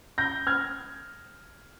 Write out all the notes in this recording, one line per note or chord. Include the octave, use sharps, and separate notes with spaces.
G6 A#6
F6 G#6